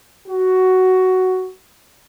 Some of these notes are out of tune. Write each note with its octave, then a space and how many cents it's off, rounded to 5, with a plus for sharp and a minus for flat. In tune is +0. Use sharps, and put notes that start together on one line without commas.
F#4 +10